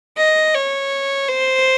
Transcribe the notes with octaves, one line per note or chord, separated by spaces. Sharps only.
D#5
C#5
C5